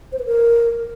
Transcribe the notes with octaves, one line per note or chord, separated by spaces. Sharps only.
C5
B4
A#4